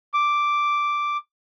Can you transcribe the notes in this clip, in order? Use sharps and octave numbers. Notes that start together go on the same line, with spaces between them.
D6